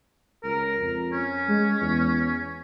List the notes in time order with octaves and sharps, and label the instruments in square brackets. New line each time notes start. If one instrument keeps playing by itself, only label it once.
[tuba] C#2 [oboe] A#4
[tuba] F2
[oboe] C#4
[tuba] G#3
E2